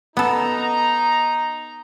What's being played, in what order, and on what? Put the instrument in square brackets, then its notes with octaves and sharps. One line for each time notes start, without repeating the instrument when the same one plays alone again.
[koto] B3 A4 [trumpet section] D#4 A#5